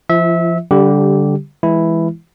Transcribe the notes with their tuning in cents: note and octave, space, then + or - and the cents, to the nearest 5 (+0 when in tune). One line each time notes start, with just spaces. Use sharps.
F3 -25 E4 +45 E5 -25
D3 -25 G3 +0 G4 -15
E3 +0 G#3 -5 E4 +0